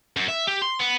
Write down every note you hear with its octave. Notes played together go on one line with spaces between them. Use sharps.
F#2
E5
G4
C6
B3